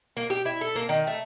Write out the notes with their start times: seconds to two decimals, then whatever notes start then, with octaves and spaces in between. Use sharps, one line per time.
0.17 A#3
0.30 G4
0.45 E4
0.61 A4
0.76 A#3
0.89 D#3
1.07 A3